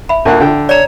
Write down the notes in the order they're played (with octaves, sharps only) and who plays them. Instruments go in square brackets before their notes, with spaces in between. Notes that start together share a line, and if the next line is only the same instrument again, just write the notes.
[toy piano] E5 B5
[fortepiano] D2 A#3 F#5
D3 G5
[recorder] C#5 [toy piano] D5 A#5